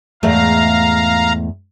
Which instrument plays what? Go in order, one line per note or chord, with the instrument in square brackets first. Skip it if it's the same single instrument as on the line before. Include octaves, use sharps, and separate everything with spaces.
[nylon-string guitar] E2 G#2 A3 [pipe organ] F5 A#5